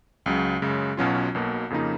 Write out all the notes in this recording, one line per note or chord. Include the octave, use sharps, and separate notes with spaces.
C#2 C#3 F#3
F#2 C#3 G#3
B1 B2 F#3 C#4 F4
B1 B2 A#3
F2 C#3 F3 A#3 D#4